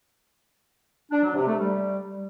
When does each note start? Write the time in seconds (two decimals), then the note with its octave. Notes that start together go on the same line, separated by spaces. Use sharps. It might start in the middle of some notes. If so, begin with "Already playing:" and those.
1.11 D4
1.23 F#3
1.35 C3
1.47 A3
1.59 G3